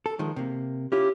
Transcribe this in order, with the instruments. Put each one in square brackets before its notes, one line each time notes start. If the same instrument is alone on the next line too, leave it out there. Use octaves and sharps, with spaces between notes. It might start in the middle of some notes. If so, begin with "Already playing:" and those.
[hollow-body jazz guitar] A4
D#3 F3 G#3
C3 A#3
[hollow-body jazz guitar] C#4 E4 F4 [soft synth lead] G4